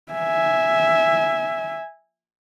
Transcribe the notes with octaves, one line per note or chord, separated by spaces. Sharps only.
E5 G#5